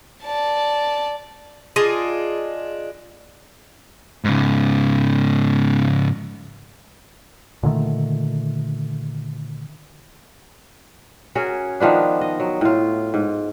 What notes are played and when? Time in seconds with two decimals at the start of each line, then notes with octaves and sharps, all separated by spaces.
0.23 D5 A5
1.76 D4 F4 G#4 D#5
4.24 G#2 C#3
7.63 A#2 D3 D#3 A3
11.35 C#4 F#4 G#4 A#4
11.80 D#3 F3 B3 D4
12.21 D#5
12.40 F#3
12.61 A2 F4
13.14 G#2